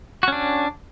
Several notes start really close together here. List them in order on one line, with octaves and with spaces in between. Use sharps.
F#4 C#4 D4